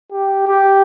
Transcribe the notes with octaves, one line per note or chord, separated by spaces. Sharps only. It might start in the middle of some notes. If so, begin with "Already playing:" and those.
G4
G4